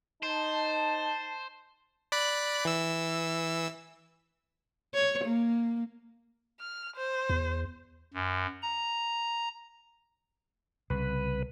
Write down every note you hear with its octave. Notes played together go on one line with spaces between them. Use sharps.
D#4 C5 A5
D5 B5 F#6
E3 E6
C#5
A#3
F6
C5
E2
F#2
A#5
C2 C#3 B4